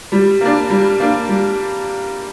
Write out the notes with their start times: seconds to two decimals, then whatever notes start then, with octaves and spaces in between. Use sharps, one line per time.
0.12 G3
0.41 A#3 D4
0.70 G3
1.00 A#3 D4
1.29 G3